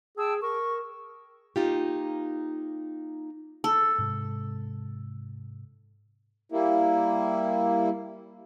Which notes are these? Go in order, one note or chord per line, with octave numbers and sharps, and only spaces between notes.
G#4 G5 A5 E6
A#4 C#6
A#3 D#4 F4 G4
A4
G#2 C3 G#3
G3 A#3 E4